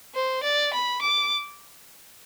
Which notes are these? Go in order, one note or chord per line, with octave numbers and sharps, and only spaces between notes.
C5
D5
B5
D6